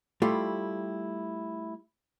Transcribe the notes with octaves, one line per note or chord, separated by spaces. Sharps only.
G3 A3 E4 F4 G4